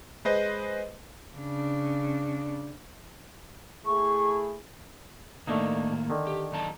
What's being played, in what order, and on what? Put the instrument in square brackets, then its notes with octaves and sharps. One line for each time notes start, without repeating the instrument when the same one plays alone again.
[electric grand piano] G#3 B4 C5 D#5
[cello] C#3 D4
[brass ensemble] A3 E4 G#4 [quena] C#6
[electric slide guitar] A2 D#3 A#3 [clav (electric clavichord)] A3 D4 D#4
[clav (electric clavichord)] D3 D#3
[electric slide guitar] G4
F#2 D#4 A5